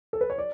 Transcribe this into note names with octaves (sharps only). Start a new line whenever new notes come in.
A4
B4
C#5
D5